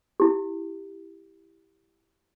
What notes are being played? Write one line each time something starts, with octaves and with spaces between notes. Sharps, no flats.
E4 G4